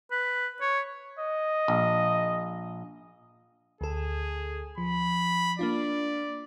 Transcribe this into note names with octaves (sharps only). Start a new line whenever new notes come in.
B4
C#5
D#5
A#1
D2 G#4 A4
F3 B5
A#3 D4 F4 D5